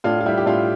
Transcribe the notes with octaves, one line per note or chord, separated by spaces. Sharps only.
A2 D4 F4
F4
G3 E4
G4
A2 D4 F4